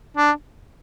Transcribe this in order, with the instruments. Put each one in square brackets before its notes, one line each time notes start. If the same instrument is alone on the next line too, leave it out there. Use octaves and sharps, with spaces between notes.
[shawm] D4